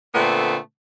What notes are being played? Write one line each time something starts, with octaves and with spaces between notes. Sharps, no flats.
A#2 D3 A3 B3 C4